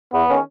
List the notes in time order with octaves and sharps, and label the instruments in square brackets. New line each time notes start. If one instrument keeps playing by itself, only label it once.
[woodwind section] E2 [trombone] B3
[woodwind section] D#3 G#3 C#4